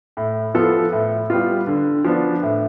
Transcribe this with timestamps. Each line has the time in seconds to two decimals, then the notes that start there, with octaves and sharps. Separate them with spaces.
0.17 A2
0.54 F3 B3 F4 A4
0.92 A2
1.30 G3 B3 F4
1.67 D3
2.04 F3 B3 D4
2.43 A2